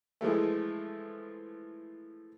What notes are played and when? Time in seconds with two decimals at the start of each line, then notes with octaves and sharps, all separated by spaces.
0.21 E3 F3 G#3 A3